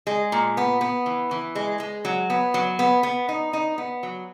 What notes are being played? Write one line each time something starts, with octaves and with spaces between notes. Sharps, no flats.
G#3
A#2
B3
B3
E3
E3
G#3
G#3
F#3
B3
F#3
B3
B3
D#4
D#4
B3
F#3